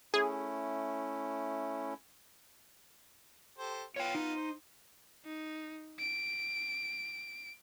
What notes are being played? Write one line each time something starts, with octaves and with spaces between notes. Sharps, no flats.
A3 C#4 E4 G#4
G4 A4 C5
B3 F4 C#5 G5
D#4
C5
D#4
D7